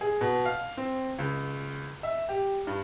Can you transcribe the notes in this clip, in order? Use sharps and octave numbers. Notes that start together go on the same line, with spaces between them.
G#4
B2
F5
C4
C#2
E5
G4
G2